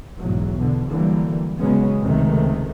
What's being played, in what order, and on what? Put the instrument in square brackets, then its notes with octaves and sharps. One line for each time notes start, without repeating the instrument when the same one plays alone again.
[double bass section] B1 E2 G#2 F#3
B2 D3
D3 E3 F#3 G3 A#3
C#3 F#3 G#3 B3 C#4
C#2 C3 D#3 A3